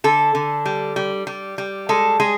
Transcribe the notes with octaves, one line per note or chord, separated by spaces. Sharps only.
D3 A4
D3
G3
G3
G3
G3
G#3 A4
G#3 G#4